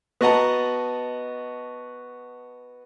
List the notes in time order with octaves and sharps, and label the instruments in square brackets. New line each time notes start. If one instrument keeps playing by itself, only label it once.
[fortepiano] B3 F#4 D#5 F#5 A5 A#5